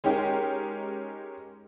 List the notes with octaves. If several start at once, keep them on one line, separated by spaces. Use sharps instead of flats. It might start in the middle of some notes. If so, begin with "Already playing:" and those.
G#3 C#4 D#4 G4 A#4